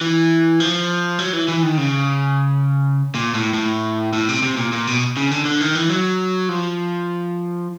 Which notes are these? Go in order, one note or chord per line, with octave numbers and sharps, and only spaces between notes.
E3
F3
F#3
E3
E3
D#3
C#3
A#2
A2
A2
A2
C3
C3
A#2
A#2
B2
C#3
D3
D3
D#3
E3
F#3
F3